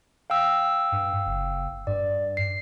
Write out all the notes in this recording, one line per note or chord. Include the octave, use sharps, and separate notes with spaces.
F5 G5 E6
G2
F#1
G2 D5
C7